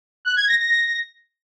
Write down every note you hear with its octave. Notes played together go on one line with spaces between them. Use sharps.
F#6
G#6
A#6
A#6